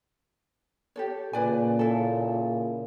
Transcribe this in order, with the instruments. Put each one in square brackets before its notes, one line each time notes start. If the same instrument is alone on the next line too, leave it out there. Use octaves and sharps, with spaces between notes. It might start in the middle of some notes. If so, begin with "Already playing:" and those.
[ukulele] G4 A4 C#5
[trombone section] A#2 C#3 [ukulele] B4 D5 G#5
[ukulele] E4 A4